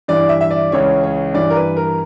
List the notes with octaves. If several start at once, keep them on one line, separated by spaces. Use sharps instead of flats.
G2 E3 D5
E5
E5
D5
C#2 C#3 E3 C#5
C#5
G2 E3 D5
A#4
B4
A#4